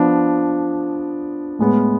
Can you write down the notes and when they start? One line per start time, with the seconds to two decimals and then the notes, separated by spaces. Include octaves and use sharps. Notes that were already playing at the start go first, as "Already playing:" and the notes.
Already playing: F3 B3 D4
1.59 A2 G#3 B3